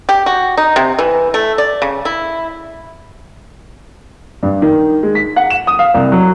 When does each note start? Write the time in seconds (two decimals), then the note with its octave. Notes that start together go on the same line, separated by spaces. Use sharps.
0.09 G4
0.26 F#4
0.57 D#4
0.76 C3
0.98 E3
1.34 A3
1.58 D5
1.82 C#3
2.05 E4
4.43 G2
4.62 D#3
5.03 G#3
5.15 B6
5.36 F#5
5.50 E7
5.67 D#6
5.79 F5
5.94 C2
6.12 F#3